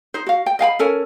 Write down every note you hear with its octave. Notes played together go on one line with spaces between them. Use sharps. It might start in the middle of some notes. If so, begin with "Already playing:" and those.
D#4 C5
F#4 F5
G5
D#5 F5 G5 B5
C#4 A4 A#4 G#5